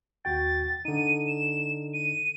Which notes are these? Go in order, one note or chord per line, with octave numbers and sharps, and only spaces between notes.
D#2 F#4 G5 A6
D3 D#4 D#7
E7
D#7